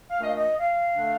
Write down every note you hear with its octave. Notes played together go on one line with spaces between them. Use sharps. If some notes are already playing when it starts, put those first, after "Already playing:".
F5
A#2 A3 D4 D#5
F5
D#5
F5
D3 A3 D4